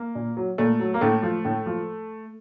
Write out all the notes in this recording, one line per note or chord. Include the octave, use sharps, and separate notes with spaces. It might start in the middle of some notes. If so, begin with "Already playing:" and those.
Already playing: A#3
A#2
F#3
A#2 A3
F#3
A#3
A2 A3
F3
A2
F3